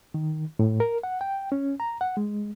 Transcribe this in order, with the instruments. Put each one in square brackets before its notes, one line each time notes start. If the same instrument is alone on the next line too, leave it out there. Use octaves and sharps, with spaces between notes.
[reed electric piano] D#3
A2
A#4
F#5
G5
C#4
A#5
F#5
G#3